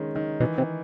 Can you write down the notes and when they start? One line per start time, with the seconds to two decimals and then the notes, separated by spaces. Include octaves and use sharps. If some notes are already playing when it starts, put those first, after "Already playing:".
Already playing: D#3 G#3 C#4
0.15 D#3
0.40 B2 E3
0.58 C3